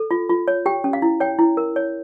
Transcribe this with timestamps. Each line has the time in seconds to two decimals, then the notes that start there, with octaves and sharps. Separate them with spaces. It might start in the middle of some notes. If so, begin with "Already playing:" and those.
Already playing: A4
0.11 F4
0.29 F4
0.48 C#5
0.66 G4 G5
0.84 C#4
0.93 F5
1.02 E4
1.20 C#5 G5
1.39 E4
1.57 A#4
1.76 C#5